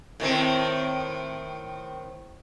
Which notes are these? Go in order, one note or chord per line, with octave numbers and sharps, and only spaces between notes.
A2 D#3 C4